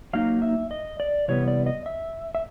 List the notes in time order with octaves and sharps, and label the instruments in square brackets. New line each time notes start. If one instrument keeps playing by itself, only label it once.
[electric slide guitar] F#3 A#3 D#4 F5
E5
D#5
D5
C3 E3 G3 B3 C#5
D5
D#5
E5
E5